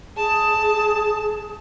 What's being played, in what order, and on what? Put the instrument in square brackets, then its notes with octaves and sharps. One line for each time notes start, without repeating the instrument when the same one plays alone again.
[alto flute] G#4 [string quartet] A5